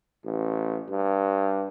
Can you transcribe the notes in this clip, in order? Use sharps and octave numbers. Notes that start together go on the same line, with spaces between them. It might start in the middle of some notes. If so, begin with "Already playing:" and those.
A1
G2